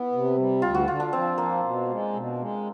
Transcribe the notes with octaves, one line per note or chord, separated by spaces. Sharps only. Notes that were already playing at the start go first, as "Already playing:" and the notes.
Already playing: B3 E4
C3
G3
D2 F4
F#4
D3 F4
D4
F3 C4
F3 A#3
B2
G#3
B2
G#3